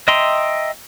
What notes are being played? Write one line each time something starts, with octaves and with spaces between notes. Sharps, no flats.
D#5 E5 G5 A#5 C6